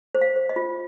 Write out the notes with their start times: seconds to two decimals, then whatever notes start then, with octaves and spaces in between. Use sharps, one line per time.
0.15 C5
0.21 F5
0.36 C5
0.49 D#5
0.56 F4